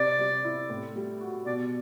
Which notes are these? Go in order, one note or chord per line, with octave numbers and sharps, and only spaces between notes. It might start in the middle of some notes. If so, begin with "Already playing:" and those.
Already playing: C3 D5
G3
E4
A2
G3
F#4
B2 D5